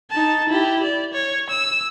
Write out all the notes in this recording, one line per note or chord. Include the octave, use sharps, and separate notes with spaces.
D#4 A5
E4 G4
D5
C#5
E6